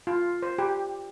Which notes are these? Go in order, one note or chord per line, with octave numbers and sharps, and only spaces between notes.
F4
C5
G4